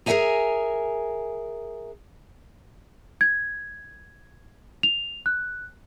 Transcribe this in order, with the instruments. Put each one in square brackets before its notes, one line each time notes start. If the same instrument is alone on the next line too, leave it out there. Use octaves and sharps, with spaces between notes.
[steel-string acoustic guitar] G#4 A#4 C5 E5 G#5 A#5
[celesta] G#6
F7
F#6